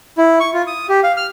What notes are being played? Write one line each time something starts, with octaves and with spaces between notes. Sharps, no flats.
E4
C#6
F4
D#6
G4
F5
F6